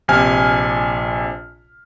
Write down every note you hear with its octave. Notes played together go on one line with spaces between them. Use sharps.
A#1 C3 G#5 F6